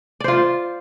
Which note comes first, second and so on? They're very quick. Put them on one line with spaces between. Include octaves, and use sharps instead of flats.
D5 C5 F4